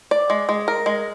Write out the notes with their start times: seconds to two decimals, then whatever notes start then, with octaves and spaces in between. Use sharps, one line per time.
0.11 D5
0.30 G#3
0.49 G#3
0.68 A#4
0.86 G#3